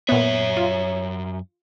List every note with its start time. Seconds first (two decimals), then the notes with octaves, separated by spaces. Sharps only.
0.09 F#2 A#2 B3 C#5 E5
0.57 F4